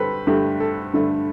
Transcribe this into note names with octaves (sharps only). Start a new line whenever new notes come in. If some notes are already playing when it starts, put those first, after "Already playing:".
Already playing: G2 D3 G4 A4 B4 C5
G2 D3 A3 G4
A4
G2 D3 A3